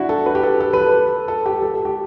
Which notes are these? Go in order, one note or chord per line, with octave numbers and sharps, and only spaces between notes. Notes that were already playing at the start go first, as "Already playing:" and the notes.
Already playing: D4 E4 F#4
A4
B4
G4
A4
A4
B4
A4
A4
G4
A4
A4
G4